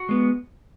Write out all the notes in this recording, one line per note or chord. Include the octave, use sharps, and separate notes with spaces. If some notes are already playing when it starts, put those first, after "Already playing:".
Already playing: F#4
G#3 B3